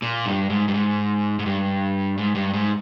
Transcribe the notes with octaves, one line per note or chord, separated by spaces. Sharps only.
A#2
G2
G#2
G2
G#2
G#2
G2
G#2
G2
G#2